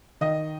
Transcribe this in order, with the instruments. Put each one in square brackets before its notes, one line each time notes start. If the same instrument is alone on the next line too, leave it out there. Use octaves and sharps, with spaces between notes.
[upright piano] D#3 D#5